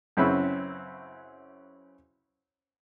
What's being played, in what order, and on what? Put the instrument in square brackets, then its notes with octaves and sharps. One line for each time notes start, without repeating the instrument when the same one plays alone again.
[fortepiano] F#2 C#3 C4 C#4 E4 B4